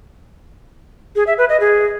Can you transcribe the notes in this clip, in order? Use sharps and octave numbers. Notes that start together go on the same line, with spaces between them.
G#4
E5
B4
D#5
G#4